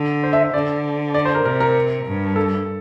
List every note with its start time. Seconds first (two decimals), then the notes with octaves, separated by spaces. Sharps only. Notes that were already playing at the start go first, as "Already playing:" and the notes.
Already playing: D3
0.23 C5
0.33 E5
0.43 E5
0.54 D3 D5
1.14 D5
1.25 C5
1.35 A#4
1.45 C3 A#4
1.60 A#4
2.06 G2
2.36 A4